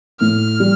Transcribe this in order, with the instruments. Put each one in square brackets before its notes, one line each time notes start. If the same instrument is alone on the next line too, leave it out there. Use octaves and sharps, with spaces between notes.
[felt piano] A2 [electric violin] F6
[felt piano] G3